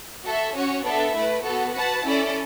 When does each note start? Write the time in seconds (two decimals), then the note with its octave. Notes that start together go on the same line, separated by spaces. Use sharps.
0.24 F#4 A4 E5
0.54 C#4 F#4 C#5
0.84 B3 D4 A4 E5
1.14 A3 E4 B4
1.44 B3 F#4 A4
1.74 F#4 B4 F#5 A5
2.05 C#4 E4 A4 D5